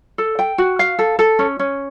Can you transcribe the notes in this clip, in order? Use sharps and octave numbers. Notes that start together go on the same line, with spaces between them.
A4
G5
F#4
F5
A4
A4
C#4
C#4